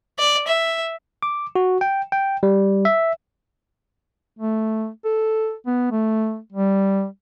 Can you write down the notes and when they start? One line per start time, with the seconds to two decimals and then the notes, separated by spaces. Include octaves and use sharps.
0.19 D5
0.47 E5
1.23 D6
1.55 F#4
1.81 G5
2.12 G5
2.43 G3
2.85 E5
4.38 A3
5.04 A4
5.67 B3
5.91 A3
6.52 G3